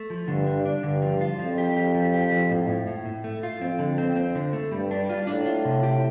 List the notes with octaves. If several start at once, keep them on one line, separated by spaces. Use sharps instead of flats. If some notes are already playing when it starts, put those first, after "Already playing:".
Already playing: A3
F3
G2 D3
D4
D4
G2 D3
F3
F4
F2 F3
G4
G4
F3
G4
F3
A2
A2
A2
A2
A3
F4
F2 C4
D3
C4
C4
D3
A3
G2 G3
D4
F4
A2 D4
F4
C3
G4